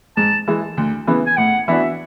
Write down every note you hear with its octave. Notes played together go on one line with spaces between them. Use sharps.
G#2 A5
E3 G#3
D2
C#3 E3 B3
G#5
A2 F#5
E3 B3 D4 F#4 E5